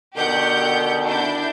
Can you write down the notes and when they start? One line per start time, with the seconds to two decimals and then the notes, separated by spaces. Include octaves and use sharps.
0.16 B2 D3 D#3 G4 F#5 G6
1.06 D4 E4 G6